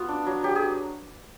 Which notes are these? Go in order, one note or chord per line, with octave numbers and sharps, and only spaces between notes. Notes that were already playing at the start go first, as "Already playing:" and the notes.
Already playing: B3 F4 F#4
D4
F#3
F#3 G4
G#4